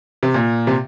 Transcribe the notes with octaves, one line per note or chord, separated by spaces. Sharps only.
C3
A#2
C3